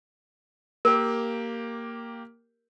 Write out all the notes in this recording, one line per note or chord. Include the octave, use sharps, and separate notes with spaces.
A#3 G4 A#4